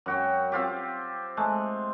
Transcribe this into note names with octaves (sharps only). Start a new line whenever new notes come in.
F#2 F#4 G5
C4 F4 G4
G#3 A3